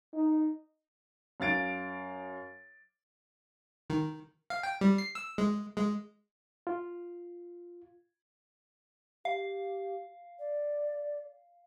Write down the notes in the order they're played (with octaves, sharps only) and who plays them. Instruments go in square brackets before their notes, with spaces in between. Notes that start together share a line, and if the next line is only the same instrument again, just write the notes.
[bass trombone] D#4
[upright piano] F#2 F5 A6 D7
[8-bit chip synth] D#3
F5
G5
G3
C7
E6
G#3
G#3
[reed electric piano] F4
[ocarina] G4 [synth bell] F5
[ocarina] D5